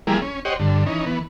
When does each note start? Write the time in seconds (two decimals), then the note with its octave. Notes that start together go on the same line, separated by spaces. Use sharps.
0.07 F3 G3 A#3 E4 G#4
0.22 C#4
0.45 G4 C5 C#5 D#5 F#5
0.60 G2 D3
0.86 E3 C#4 D#4
1.06 E3 B3